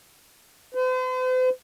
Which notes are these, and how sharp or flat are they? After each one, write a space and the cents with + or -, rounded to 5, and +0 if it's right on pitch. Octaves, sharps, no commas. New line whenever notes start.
C5 -45